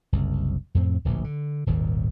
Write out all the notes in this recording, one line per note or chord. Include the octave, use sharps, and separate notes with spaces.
F#1 C2
F2 A2 C4
D1 A#1 A#2
D3
D#1 G#1 D#2 A#2